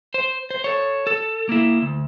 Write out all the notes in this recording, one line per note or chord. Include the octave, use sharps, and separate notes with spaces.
C5
C5
A4 C#5
A4
A#3 E4
D2